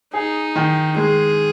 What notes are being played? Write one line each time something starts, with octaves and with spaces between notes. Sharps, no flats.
D#4 G#4
D#3
G#3 G#4